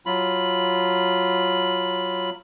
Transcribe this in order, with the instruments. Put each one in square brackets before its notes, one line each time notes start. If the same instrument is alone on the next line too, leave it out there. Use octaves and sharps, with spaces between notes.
[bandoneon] F#3 F4 B5